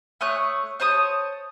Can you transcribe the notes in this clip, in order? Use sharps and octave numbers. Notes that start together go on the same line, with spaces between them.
A3 C#5 D#6 F#6
C5 C#5 A5 D#6